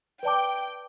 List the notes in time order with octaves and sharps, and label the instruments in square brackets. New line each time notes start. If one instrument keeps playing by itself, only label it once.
[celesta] B4 D5 A5 D6 [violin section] G5